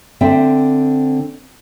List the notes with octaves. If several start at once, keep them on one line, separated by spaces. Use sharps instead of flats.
D3 C4 E5 G5